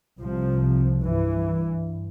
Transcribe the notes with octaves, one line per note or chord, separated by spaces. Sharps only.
C2 C3 F3
G2 E3